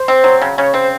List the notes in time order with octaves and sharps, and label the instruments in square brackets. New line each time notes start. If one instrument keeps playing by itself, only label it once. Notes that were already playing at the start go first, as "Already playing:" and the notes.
Already playing: [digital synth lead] C5
[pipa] C4
F#3
C#3
[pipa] C#3 [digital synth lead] C#5
[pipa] C4 [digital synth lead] C5